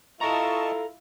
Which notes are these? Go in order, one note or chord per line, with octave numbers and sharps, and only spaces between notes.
E4 F4 A4 D#5 A5 A#5 C#6